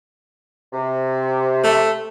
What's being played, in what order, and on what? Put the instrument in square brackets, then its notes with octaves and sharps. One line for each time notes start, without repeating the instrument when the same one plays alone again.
[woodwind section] C3
[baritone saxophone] A3